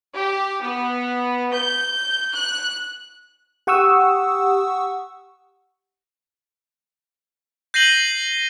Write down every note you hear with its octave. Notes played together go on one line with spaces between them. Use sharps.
G4
B3
G6
F#6
G4 F#5 C#6 D#6 E6
G6 A#6 C7 D#7 F#7 G7